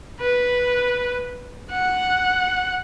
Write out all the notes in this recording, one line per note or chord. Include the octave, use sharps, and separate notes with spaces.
B4
F#5